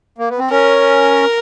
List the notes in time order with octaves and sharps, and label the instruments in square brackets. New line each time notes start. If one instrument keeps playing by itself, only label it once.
[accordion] A#3
B3
C4
[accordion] C#4 [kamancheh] A#4